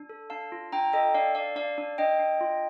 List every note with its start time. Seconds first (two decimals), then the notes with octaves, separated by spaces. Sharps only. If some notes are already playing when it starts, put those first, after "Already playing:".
Already playing: D4
0.09 A4
0.30 D4 F5 A5
0.52 F4
0.72 D4 G5 A#5
0.93 A4 D#5 G5
1.14 D4 D5 F5
1.35 D4 D5 F5
1.56 D4 D5 F5
1.78 D4
1.98 D4 D#5 G5
2.19 D4
2.41 F4